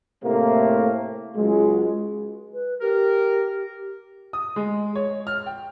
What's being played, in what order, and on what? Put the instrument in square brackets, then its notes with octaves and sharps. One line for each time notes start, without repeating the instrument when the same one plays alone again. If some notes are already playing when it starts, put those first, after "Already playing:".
[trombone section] A2 C3 A3 A#3 C4
C#2 F#3 G#3
[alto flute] B4
[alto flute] G4 [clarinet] A#4
[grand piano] D#6
G#3
C#5
F6
G5